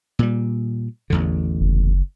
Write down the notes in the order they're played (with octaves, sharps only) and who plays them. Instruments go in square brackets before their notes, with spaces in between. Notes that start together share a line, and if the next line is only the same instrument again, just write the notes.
[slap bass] A#2 G3
A1 E2 D3
[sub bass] F#1